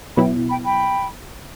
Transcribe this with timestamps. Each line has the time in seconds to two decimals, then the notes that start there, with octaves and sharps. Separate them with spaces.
0.17 B2 F#3 B3 E4 G5 B5
0.49 G5 B5
0.64 G5 B5